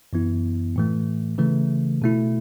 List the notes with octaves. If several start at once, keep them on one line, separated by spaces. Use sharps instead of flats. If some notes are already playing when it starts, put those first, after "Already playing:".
F#2 E3 B3 E4
A2 E3 A3
C#3 E3 A3
B2 A3 E4